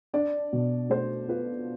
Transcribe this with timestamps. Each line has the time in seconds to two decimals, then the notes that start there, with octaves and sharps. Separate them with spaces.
0.14 D4 D5
0.53 B2
0.90 A3 C5
1.28 F4 B4